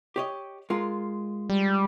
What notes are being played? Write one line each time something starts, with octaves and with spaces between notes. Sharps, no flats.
G4 C#5 D#5
G#3 F4 A#4
G3